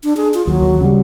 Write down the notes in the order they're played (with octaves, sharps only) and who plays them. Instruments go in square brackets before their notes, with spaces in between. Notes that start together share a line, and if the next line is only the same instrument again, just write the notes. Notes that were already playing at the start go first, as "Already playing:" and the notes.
[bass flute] D4
G#4
F4
[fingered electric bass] D#2 [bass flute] F#3
[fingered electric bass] D#2
C#3 G3